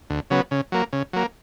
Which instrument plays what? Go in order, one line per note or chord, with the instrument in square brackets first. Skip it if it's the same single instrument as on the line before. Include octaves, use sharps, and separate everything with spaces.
[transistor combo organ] D2
C#3 F#3 B3
C#3
F#3 A#3
C#3
F#3 A#3